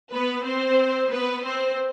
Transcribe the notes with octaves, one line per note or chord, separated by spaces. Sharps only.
B3 B4
C4 C5
B3 B4
C4 C5